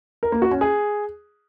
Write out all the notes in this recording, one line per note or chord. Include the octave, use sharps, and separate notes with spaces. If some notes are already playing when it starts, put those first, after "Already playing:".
A#4
A#3
F#4
C#4
G#4